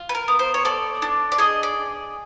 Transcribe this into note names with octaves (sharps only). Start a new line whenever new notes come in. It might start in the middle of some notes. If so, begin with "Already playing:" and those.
Already playing: F4
B4
A#4
B3
C5
C#5
A4 D5
D4
D5
G#4 D#5
D5